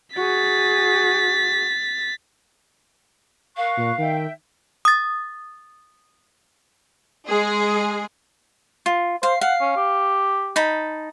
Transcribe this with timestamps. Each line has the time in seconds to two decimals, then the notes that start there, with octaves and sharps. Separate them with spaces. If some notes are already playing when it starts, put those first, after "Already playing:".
0.16 F#4 G#4 A6 B6
3.56 A#4 F5 C#6 F#6
3.77 A#2
3.98 D#3 E5 G5
4.85 D#6 A6
7.27 G#3 G#4
8.86 F4
9.23 C5 F5
9.41 F5 F#5
9.61 C#4
9.77 G4
10.56 D#4 A5 B5